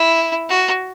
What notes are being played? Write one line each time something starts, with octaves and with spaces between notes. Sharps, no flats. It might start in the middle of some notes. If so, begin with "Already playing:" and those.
Already playing: E4
F#4